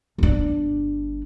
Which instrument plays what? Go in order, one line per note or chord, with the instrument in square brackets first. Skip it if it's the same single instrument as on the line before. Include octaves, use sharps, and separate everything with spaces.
[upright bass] G1 D4